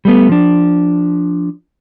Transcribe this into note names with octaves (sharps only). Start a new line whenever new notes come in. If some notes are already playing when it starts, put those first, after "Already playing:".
G3 A3 B3
F3 D4